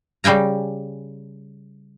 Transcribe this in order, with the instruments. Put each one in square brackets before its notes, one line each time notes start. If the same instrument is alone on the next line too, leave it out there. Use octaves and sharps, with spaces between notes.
[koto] C#3 G3 G5 G#5 A#5